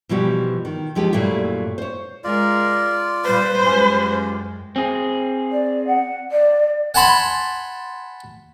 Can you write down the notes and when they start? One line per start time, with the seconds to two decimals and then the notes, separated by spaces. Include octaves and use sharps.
0.09 B2 E3 F3 G3 F#4 G4
0.65 D#3
0.95 D#2 F3 G#3 G4
1.13 F#2 A#2 F#3 G3 A3 E4
1.78 C5 C#5
2.24 G#3 F4 A#4 D5
3.24 A#2 G3 B4 C5
3.65 F#2 G#3 C#4 F4 G4
4.76 C4 G#4
5.52 D5
5.87 F#5
6.31 D5
6.94 F#5 G#5 A5 B5 C6